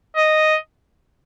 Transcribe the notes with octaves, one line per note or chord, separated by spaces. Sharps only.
D#5